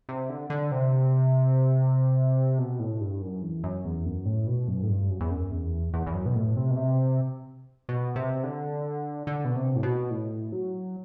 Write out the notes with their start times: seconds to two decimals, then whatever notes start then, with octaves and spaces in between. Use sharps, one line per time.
0.09 C3
0.30 D3
0.50 D3
0.72 C3
2.59 B2
2.79 A2
3.01 G2
3.22 F#2
3.42 E2
3.64 F#2
3.85 E2
4.05 F#2
4.26 A2
4.47 B2
4.68 F#2
4.83 A2
4.88 G2
5.10 F#2
5.21 E2
5.30 F#2
5.51 E2
5.94 E2
6.07 E2
6.14 F#2
6.26 B2
6.35 A2
6.56 C3
6.71 B2
6.77 C3
7.89 B2
8.16 C3
8.44 D3
9.27 D3
9.45 B2
9.56 C3
9.76 A2
9.83 B2
10.10 A2
10.52 F#3